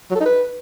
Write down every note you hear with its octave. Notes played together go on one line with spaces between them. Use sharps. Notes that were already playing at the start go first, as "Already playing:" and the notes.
F#3
A4
D#4
B4